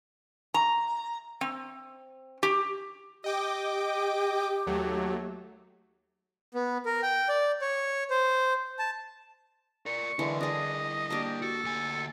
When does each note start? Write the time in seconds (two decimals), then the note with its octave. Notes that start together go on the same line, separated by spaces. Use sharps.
0.54 A#5
1.41 C4
2.43 G4
3.24 G4 D#5 G5 D6
4.67 D#2 F#3 A3
6.54 B3
6.86 A#4
7.03 G5
7.29 D5
7.61 C#5
8.10 C5
8.79 A5
9.86 A#4 D5 C#6
10.19 D3 E3 G#3 E4 A#4
10.41 D4 G#4 D#5
11.10 A#3 D4 G4
11.42 F#4 A4
11.64 D2 G#5